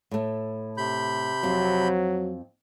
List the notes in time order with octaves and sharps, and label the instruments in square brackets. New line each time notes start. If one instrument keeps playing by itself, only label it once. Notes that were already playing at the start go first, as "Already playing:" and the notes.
[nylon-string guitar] A2 A3
[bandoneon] C3 B5 G6
[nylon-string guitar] F2 C4 [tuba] F#3